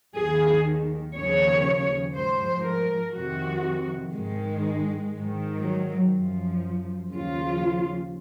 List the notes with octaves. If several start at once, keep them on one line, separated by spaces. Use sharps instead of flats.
D#2 D#3 G#4
D#2 C#3 F3 C#5
G#2 F3 C5
A#4
F2 C3 D#3 F#4
G#2 D#3 G#3
G#2
D#3
F#3
F#2 F3
D#2 C#3 F3 F4